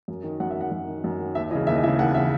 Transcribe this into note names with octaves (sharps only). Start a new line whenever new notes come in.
F#2
D#3
F#2 F#5
E5
D#3 F#5
F#2
D#3
F#2
D#3
D#2 E5
C#3 E3 D#5
D#2 E5
D#5
C#3 E3 E5
D#2 F#5
C#3 E3 E5